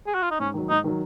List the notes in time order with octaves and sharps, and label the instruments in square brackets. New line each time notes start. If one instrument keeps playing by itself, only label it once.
[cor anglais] G#4
F#4
F4
D#4
[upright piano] G#2 [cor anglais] C#4
[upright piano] D#3 F#3
[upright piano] G#2 [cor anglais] D#4
[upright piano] D#3 F#3